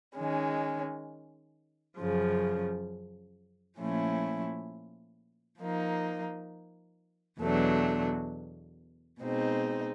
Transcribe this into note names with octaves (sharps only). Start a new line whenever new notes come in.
D#3 G#3 C#4
F#2 C#3 F3
A#2 F3 A3 C#4 E4
F3 A#3 D#4
E2 B2 F#3 A3 D4
B2 G#3 C4 D#4